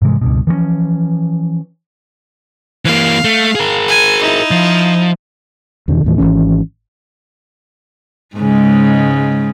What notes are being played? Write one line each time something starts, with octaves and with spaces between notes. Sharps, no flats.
G#2 C3 E3 G#3
C#2 G2 B2
E3 F3 G#3 C#4
E3 A#3 F5
A3
G#4 A#4
G#5
D#4 E4
F3
E2 B2 D3 D#3
D#2 A2 E3
G#1 D#2 E3 C#4
G#2 C#3 G#3